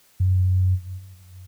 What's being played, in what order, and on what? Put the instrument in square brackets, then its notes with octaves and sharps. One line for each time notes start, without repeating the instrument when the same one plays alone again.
[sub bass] F#2